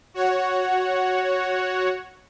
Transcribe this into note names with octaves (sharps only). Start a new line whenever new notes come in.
F#4 C#5 F#5